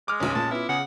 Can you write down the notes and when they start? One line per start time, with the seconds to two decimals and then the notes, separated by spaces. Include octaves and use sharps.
0.08 G#3 D6 D#6 F6
0.20 F1 B1 C#4
0.35 A#2 A5
0.51 B3 E4 F4
0.69 C#3 G#4 F#5